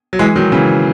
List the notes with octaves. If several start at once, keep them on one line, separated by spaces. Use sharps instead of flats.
F#3
E3 G#3
D#3 F#3
C#3 E3